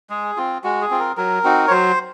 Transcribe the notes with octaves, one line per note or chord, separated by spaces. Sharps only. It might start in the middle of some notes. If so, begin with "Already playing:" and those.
G#3 G#4
C4 F4
G#3 F#4
G#4
C4 F4
A#4
F#3 A#4
C4 D#4 F#4
C#5
F#3 C5